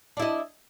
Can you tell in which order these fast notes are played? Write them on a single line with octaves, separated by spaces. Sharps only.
D4 E4 D#5